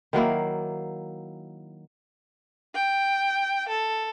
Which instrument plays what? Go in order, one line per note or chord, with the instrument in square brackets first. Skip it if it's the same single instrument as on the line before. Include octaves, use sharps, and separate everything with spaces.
[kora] D#3 F#3 A#3 E4
[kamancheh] G5
A4